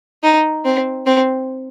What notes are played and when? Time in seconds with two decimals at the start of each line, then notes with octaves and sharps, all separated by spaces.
0.23 D#4
0.65 C4
1.06 C4